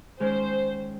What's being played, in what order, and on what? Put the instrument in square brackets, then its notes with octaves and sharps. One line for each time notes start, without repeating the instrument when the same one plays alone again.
[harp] D#3 G#3 C#4 [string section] C5